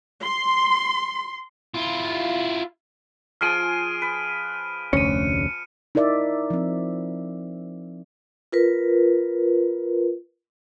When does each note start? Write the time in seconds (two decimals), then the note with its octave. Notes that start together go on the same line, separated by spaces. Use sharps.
0.24 C6
1.74 E4 F4
3.41 F3 G#4 C6 F6 D7 D#7
4.02 B4
4.93 F1 D2 C#4 C#7 D#7
5.95 D#4 E4 A#4 D5 E5
6.50 F3 C4
8.52 F4 A#4 B4